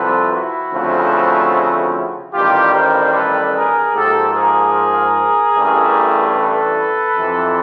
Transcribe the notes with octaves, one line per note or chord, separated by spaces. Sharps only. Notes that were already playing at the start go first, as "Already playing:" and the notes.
Already playing: C2 C3 F3 A4 B4
E4 F#4
D2 C#3 F3 A3 C4
A1 G2 D#3 G3 F4 G4
A#4 C5
A4 B4
G#4 A#4
G#2 F3 A#3 G4 A4
G#4 A#4
A1 G2 E3 A3
A4 B4
F2 C3 E3